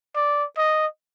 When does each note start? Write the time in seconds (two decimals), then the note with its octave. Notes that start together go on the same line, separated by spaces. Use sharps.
0.15 D5
0.58 D#5